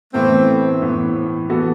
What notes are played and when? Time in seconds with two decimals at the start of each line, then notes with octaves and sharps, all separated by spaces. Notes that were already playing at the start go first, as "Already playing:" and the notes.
0.13 A2 E3 A3 B3 C4
0.82 A2 E3 B3
1.49 E3 B3 F#4 A4